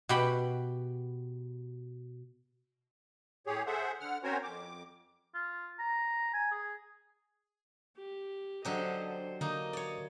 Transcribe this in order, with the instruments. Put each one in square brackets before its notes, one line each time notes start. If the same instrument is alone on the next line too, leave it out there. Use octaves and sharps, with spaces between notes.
[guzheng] B2 F#4 G4 G5 B5
[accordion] A2 G4 G#4 C#5
G#4 A4 C5 E5 F#5
D3 F#5 F6
C4 C#4 F#4 A#4 C5 C#5
F2 D6
[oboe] F4
A#5
G#5
G#4
[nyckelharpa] G4
[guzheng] D3 F#3 G4 [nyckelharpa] C5 D#5
[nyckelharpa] C5
[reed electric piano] D3 [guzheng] A#3 D#4 [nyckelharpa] D#5
[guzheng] C#5 D5